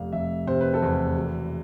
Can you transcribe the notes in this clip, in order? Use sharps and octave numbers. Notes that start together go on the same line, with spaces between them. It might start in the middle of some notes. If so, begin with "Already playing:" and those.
Already playing: F1 F5
F1 E5
C3 C5
B4
A4
E2 B4
E1